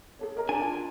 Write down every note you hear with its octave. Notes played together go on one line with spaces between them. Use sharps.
G#4 A4 C#5
A#4 D#5 A#5
D4 F#4 D5 G#5
F4 A5